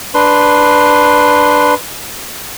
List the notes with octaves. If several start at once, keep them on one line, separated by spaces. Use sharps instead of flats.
D4 B4 C6